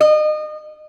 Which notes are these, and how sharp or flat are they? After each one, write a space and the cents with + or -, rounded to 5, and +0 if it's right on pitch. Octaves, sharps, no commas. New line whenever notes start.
D#5 -30